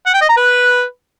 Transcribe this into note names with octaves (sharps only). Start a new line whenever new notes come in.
F#5
G5
D#5
A#5
B4